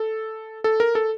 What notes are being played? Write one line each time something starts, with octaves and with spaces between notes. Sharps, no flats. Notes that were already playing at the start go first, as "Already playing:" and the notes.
Already playing: A4
A4
A#4
A4